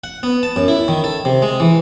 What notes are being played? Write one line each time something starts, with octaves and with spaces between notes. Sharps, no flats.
F#5
B3
A5
F#2
E4
D#3
A4
C3
G#3
E3